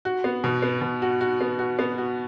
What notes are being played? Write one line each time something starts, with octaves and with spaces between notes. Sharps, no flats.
F#4
B3
B2
B3
B2
F#4
F#4
B3
F#4
B3
F#4